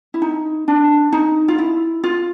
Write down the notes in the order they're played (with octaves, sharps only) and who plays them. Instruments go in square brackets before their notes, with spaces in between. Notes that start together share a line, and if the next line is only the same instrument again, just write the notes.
[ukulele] E4
D#4
D4
D#4
F4
E4
F4